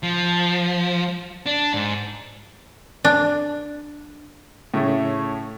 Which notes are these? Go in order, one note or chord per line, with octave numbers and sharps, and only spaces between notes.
F3
D4
G#2
D4
A2 C#3 A3